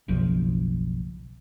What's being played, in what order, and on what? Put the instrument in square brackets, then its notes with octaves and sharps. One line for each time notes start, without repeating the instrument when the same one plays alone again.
[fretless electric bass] F#1 B1 F3